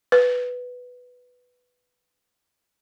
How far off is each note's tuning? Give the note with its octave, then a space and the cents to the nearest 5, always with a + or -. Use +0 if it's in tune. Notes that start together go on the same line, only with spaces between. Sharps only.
B4 +5